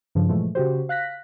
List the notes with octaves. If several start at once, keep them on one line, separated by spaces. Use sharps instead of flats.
G2 C#3 F3
A#2 E3 F3 G#3 A3
C#3 F#4 G4 C5
F5 F#6 A#6 B6